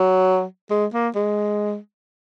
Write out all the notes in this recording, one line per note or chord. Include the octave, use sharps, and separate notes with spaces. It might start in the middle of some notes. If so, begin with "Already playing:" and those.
Already playing: F#3
G#3
A#3
G#3